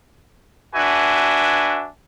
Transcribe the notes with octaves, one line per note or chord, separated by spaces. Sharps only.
D4 F#4 B4 E5 G#5